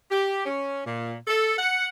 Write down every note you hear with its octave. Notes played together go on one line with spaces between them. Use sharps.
G4
C#4
A#2
A4
F#5